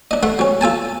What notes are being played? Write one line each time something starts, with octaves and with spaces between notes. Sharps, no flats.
D4 D#5
A3 F#5 C6
F#3 C#4
F4 A4 G#5 A5